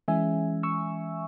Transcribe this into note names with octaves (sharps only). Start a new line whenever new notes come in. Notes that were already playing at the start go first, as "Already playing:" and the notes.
E3 G#3 C#4 E5 G#5
C#6 E6